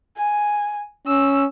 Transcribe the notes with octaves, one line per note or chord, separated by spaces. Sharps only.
G#5
C#4 E6